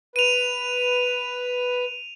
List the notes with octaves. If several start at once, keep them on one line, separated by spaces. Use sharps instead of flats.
B4 D#7 F7